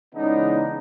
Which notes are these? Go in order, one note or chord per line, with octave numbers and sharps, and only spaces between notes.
C#3 E3 G#3 B3 D4 D#4